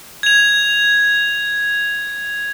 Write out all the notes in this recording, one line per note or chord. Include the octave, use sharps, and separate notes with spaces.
G#6 F7